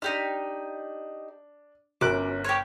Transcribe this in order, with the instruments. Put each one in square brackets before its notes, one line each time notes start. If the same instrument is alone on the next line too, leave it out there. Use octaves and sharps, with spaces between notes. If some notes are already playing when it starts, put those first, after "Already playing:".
[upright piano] D4 [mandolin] D#4 G4 F6
[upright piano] G1 A#4 F#6 [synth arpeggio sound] C#4 F#4 [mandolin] D6
[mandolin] G4 C#5